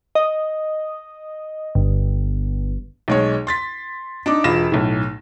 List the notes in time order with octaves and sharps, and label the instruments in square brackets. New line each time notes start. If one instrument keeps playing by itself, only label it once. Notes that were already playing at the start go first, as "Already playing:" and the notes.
[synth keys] D#5
G1
[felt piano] B1 G#3 C#5
C6 A6 B6
D4 D#4 D6
E1 F4 B5 A#6 E7
B1 A2